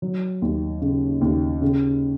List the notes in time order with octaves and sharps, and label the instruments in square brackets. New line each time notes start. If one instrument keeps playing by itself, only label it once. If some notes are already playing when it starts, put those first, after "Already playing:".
[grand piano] F#3
D#2
C#3
D#2
C#3